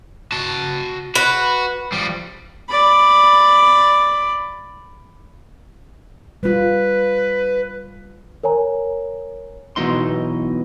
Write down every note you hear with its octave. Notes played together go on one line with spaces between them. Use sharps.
F#4 A5
F#4 B4
F3 G3
D5 B5
G3 F4 B4
A#4 C#5 G#5 A#5
B1 B2 E3 D#4 C6